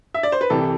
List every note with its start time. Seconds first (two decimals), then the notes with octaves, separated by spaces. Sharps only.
0.14 E5
0.23 D5
0.32 C5
0.41 B4
0.50 C2 C3 E3 A4